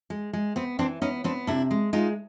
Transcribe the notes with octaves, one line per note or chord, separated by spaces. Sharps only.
G#3
G#3
B3 C4
E3 C4 D4
B3 C#4 D#4
B3 C4 D4
C3 D4 E4
G#3
G#3 D#4 F4